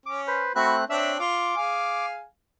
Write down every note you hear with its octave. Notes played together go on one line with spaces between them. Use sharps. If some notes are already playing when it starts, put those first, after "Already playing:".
C#4 D6
B4 C5
A3 C4 F#4 B5 F#6
C4 D4 C#5 E5 E6
F4 D6
G#4 F5 G#5